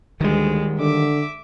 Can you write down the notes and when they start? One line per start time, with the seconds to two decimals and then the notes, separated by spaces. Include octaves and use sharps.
0.21 D2 D#3 G3 G#3
0.79 D3 E5 D6